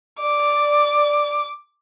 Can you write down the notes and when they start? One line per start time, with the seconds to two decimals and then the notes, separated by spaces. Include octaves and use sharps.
0.20 D5 D6